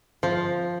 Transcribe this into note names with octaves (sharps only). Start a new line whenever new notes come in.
F3